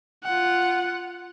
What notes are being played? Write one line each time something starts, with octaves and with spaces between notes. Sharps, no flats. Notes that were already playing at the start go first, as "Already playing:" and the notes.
F4 F#5